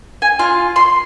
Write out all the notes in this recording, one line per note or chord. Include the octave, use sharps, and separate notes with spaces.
G#5
F4
C6